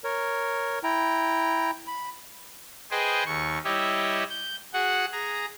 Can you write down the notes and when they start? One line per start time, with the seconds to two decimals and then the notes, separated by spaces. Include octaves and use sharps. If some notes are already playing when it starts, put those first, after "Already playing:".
0.04 A#4 C#5
0.84 E4 G5 A#5
1.87 B5
2.91 G#4 B4 C5 D#5 G5 G#5
3.26 D#2 C#6
3.65 G3 E4 G4 C#5 D#5 E5
4.30 G6
4.73 F#4 G#4 F#5
5.12 G#4 A#5